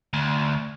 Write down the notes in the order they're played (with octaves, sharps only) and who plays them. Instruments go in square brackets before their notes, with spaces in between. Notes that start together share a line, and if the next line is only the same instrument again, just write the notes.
[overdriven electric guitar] D2